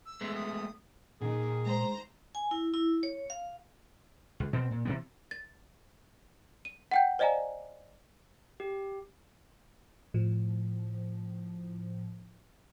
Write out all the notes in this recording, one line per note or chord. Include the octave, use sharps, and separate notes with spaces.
E6
G#3 A3 B3
D#6
A#2 D#3 G#4
G#3 C5 A#5
G#5
E4
E4
C#5
F5
C#2
B2 C4
A#2
C3 E3 B3
A6
D#7
F#5 G5 G6
C5 D5 D#5 F5 G#5 A#5
G4
A2 F3